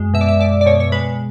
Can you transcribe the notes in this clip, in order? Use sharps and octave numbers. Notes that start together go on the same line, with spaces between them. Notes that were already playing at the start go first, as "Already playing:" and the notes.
Already playing: F#2 G#3
B2 E5
D5
E5
B2 D5
D5
B2 C#5
C#5
G#3 B4